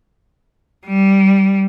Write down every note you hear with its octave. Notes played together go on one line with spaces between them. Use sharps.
G3